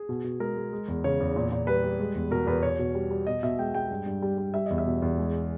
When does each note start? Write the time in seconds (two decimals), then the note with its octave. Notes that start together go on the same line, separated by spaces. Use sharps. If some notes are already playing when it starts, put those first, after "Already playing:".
Already playing: G#4
0.09 B2
0.24 B2
0.40 G#3 A#4
0.57 G#3
0.73 G#3
0.88 E2
1.04 C#3 C#5
1.20 E2
1.36 A#2
1.52 A#2
1.67 G3 B4
1.84 G3
2.00 G#3
2.15 E2
2.31 B2 A#4
2.47 E2 B4
2.63 B2 C#5
2.79 B2
2.95 G3
3.11 G3
3.27 B2 D#5
3.43 B2 E5
3.59 G#3 G5
3.74 G#3 G5
3.91 G2
4.06 G2
4.22 G3
4.38 G3
4.54 G3 E5
4.66 E2 D#5
4.78 E5
4.86 B2
5.02 E2
5.17 G#3